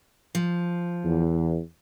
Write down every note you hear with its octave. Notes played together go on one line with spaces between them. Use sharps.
F3
E2